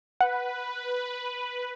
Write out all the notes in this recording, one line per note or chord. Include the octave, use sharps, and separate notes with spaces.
B4 F#5